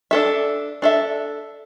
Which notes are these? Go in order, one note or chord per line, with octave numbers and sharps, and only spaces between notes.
D4 A4 E5
D4 A4 E5